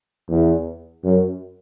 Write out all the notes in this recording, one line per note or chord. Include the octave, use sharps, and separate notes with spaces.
E2
F#2